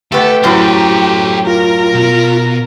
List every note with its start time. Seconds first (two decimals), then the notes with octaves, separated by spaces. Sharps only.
0.12 A3 B3 G4 A4
0.44 F#2 A2 F#3 A4 C5
1.47 F4 A#4 A#5
1.94 B2